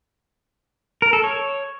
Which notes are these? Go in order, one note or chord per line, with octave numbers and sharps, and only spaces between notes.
A#4
A4
C#5